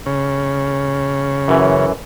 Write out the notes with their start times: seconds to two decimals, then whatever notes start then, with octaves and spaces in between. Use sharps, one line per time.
0.06 C#3
1.48 F#2 E3